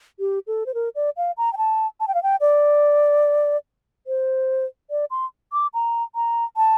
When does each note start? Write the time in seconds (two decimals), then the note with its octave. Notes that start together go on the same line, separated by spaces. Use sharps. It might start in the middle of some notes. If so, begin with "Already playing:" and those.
0.20 G4
0.47 A4
0.66 C5
0.74 A#4
0.95 D5
1.17 F5
1.37 A#5
1.53 G5
1.57 A5
2.00 A5
2.08 G5
2.15 F5
2.23 G5
2.41 D5
4.07 C5
4.91 D5
5.11 C6
5.53 D6
5.74 A#5
6.15 A#5
6.57 A5